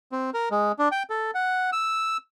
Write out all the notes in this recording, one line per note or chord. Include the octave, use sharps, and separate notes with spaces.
C4
A#4
G#3
D4
G5
A4
F#5
E6